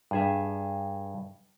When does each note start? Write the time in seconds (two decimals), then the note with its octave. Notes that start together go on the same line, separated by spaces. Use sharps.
0.11 G2 G#4 E5